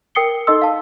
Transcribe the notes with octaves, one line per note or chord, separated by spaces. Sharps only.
A#4 G5 D#6 C7 C#7 G7
D#4 A4 D#5 C6 E6
F5 A5